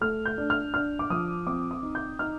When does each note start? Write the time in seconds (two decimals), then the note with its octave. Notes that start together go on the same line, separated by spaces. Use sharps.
0.01 A3 F6
0.25 G6
0.38 D4
0.50 F6
0.74 D4 F6
0.99 D6
1.10 F3 D#6
1.47 C4 D6
1.71 D#6
1.83 D#4
1.95 G6
2.19 D#4 F6